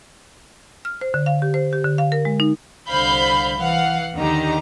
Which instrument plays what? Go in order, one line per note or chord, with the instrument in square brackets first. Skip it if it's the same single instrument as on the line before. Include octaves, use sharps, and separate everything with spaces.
[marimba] F6
C5
D3
F5
G4
C5
G4
D3
F5
A#4
G#3
D#4
[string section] C2 D3 C5 F5 B5 G6
E3 F5 F#5
D#2 D3 D#3 D#4 G4 A#5